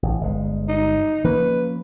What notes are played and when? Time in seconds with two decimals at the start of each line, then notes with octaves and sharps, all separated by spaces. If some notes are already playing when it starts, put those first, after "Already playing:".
0.03 A1
0.21 G1 G#3
0.68 D#4
1.24 F3 A#3 C#4 B4